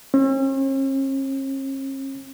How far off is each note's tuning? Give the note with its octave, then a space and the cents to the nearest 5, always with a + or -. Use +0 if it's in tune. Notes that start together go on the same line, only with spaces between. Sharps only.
C#4 -45